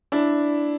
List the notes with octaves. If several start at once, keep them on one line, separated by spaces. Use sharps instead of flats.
D4 E4